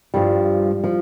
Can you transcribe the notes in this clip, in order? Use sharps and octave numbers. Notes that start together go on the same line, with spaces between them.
G2 F3 G3
F3